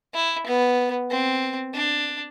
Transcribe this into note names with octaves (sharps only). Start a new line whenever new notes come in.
E4
B3
C4
D4